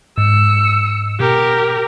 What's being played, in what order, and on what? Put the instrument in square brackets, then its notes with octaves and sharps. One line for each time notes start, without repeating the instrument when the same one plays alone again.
[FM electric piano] G#2 [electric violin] E6 C#7
[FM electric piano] B2 [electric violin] G4 A#4